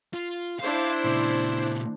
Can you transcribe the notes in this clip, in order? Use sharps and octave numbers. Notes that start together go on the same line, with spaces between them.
F4
D4 E4 C5 F5
A#2 C#3